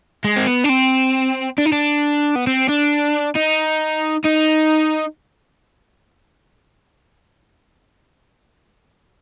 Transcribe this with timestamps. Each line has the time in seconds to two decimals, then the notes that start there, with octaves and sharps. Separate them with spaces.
0.24 G#3
0.37 C4
0.48 B3
0.64 D4
0.69 C4
1.58 D4
1.66 D#4
1.72 D4
2.36 B3
2.47 C4
2.68 D4
3.36 D#4
4.24 D#4